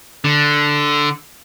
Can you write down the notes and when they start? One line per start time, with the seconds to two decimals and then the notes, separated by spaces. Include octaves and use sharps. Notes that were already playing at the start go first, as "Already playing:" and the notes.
0.25 D3